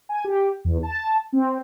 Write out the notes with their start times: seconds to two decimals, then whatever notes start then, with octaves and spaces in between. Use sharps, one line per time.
0.09 G#5
0.24 G4
0.65 E2
0.83 A5
1.33 C4